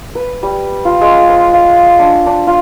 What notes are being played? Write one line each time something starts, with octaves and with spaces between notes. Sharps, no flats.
B4
G3
F4
G#3
C5
F5
D4
D4
F4